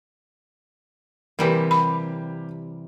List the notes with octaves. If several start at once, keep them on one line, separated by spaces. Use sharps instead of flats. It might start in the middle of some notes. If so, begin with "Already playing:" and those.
C3 E3 G3 A#3 G4
B5